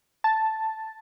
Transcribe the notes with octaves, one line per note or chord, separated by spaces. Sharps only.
A5